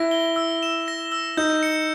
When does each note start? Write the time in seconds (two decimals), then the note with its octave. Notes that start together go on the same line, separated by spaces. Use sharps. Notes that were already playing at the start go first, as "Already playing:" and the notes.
Already playing: E4 A#6
0.11 G7
0.36 E6
0.63 E7
0.88 A#6
1.12 E6
1.37 D#4 G6
1.63 C#7